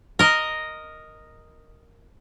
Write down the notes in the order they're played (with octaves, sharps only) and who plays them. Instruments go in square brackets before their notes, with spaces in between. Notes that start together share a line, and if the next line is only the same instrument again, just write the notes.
[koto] A#4 D#5